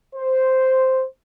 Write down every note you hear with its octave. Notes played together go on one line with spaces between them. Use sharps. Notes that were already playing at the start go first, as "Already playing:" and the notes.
C5